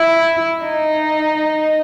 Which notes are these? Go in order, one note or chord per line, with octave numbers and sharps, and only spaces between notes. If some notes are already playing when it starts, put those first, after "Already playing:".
Already playing: E4
D#4